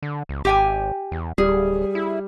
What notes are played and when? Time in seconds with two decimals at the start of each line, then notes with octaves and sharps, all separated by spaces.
0.02 D3
0.29 C#2
0.45 G#1 G4 G5 G#5
1.12 E2
1.38 D1 G3 G#4
1.95 E4